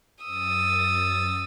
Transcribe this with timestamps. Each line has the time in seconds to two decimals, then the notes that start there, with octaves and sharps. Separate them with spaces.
0.25 F#2 D#6 E6 A6